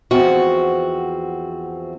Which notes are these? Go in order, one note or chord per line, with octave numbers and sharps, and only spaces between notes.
E2 F3 C4 F#4